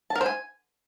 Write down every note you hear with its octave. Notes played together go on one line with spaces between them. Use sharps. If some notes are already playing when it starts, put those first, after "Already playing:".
A5
A#4
C5
G#5